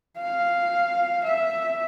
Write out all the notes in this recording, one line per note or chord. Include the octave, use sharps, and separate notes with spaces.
F5
E5